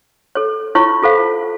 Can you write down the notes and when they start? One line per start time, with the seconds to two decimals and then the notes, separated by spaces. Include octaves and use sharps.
0.35 A4 C#5
0.75 E4 F4 C#5 C#6
1.03 F4 A4 C5 F5